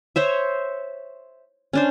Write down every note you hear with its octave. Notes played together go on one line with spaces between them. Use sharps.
C5 C#5 E5
C#4 D4 C5